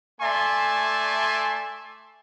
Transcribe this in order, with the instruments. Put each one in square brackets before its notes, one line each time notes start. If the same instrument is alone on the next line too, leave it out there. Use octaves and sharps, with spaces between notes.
[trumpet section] A3 D5 E5 G#5 A5 C6